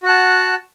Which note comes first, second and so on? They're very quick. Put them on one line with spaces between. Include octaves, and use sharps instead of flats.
F#4 F#5 A5